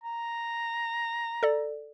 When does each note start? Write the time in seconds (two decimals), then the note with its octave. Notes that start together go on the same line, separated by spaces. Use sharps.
0.04 A#5
1.43 A4 D5